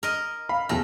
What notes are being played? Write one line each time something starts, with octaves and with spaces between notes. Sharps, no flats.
A#4 D#5
F5 B5
E2 A3 F6 A#6